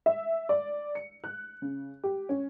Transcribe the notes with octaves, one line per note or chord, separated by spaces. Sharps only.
E5
D5
C#7
F#6
C#3
G4
C#4